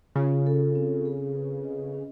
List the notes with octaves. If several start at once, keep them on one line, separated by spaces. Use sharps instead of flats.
C#3 F4
A4
C4
G#4
B4
D#5
C#4